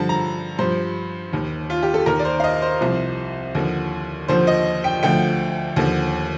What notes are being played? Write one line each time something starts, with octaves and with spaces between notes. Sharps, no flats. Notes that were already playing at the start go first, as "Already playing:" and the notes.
Already playing: G2 D3 F3 A5
A#5
G2 F3 C5
D#2 D#3
F4
G4
A4
D#2 D#3 A#4
D5
C5
F5
D#5
C5
C2 C3 F3
D#2 D3 F3
D#2 D3 F3 C5
D#5
G5
D2 D3 F3 G5
D#2 D3 F3